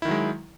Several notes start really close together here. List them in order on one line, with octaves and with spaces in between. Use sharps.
E4 D#3 F#3 G#3